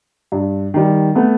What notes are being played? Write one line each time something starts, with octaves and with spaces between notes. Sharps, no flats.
G2
D#3 G3
A3 B3